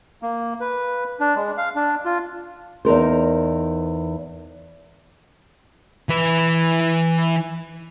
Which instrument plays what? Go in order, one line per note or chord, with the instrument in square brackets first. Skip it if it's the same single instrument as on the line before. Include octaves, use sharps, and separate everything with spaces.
[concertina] A#3
B4
D4
G#3
F5
D4
F4
[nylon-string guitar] E2 D#4 A#4 C5
[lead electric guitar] E3 B4